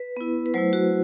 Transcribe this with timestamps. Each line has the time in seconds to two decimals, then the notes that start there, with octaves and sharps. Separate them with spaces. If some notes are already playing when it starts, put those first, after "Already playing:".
Already playing: B4
0.17 B3 E4
0.46 B4
0.54 F#3 A3 E4 C5
0.73 F#4